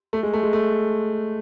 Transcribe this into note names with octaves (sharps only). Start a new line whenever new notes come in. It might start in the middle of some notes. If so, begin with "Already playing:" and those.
A3
G#3
A3
G#3
A3